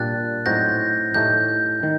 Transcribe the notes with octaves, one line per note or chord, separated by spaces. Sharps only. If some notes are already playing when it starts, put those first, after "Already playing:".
Already playing: A#2 G3 D4 G4 F#6 A6
A2 F#3 C4 D#4 F#4 G6 A#6
A2 A3 D#4 G4 G6
D#3